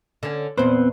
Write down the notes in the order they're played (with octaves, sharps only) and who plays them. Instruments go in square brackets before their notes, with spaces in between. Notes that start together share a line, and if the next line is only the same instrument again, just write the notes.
[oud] D3 C#4
[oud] E2 A#2 C5 [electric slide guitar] B3 C4 B4